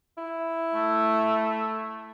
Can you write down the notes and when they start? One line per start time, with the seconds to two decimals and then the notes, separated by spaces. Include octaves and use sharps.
0.18 E4
0.74 A3